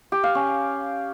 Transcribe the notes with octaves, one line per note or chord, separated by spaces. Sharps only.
G4
F5
C#4